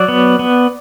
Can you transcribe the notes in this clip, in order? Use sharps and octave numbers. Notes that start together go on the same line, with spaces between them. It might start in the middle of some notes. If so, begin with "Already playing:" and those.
Already playing: F#3 D5
B3
B3